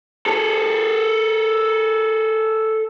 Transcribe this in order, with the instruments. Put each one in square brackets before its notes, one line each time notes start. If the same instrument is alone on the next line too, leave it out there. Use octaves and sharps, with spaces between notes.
[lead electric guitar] G#4 A4